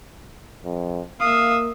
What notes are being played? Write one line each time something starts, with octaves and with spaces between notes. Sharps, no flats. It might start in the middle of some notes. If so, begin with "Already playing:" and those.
F2
A#3 E5 F5 D#6